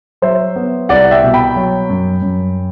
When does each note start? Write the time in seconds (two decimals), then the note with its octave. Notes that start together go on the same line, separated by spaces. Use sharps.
0.22 F#3 C5 E5
0.56 B3
0.89 C2 D5 F#5
1.11 E5 G5
1.23 B2
1.34 G5 B5
1.56 F#3
1.90 F#2
2.22 F#2